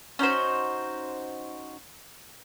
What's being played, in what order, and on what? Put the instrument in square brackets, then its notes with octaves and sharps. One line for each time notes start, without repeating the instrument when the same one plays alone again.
[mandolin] C#4 D#4 F#4 C5